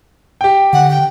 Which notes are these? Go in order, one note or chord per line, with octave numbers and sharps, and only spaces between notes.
G4 G5
D3 F#5
G5